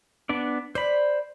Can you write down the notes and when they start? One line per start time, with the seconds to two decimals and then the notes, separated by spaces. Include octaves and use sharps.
0.29 B3 D4 D5
0.75 B4 C5 D5 B5